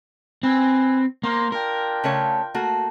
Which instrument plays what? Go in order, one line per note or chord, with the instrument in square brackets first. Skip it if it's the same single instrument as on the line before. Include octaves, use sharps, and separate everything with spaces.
[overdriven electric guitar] C4 [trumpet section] B4 G#5
[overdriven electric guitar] A#3 [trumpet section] C5 A#5 C6
[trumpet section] D4 F4 G5 [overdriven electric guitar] A#4
[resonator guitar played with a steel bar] C#3 A3 C#5
A3 A#3 F#4